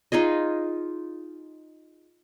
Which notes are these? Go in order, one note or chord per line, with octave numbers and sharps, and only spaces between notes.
D#4 F4 G#4 D#5